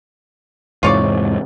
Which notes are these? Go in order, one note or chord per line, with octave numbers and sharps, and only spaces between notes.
E2 G#2 C3 F4 C#5 D5